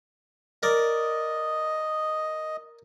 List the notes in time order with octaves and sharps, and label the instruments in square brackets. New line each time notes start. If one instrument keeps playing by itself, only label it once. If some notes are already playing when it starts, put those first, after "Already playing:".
[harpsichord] A#4 D5 [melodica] D#5